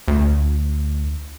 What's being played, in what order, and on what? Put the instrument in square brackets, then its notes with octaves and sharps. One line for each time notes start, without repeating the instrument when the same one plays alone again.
[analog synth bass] D2